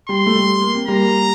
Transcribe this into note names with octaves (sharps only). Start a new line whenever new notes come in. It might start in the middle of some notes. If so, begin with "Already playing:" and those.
G3 C6
A3
G3
A#3
C4
G3 A#3 A#5